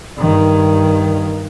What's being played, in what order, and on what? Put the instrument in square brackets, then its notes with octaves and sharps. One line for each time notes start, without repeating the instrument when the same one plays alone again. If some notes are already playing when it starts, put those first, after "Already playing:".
[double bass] G2 D#3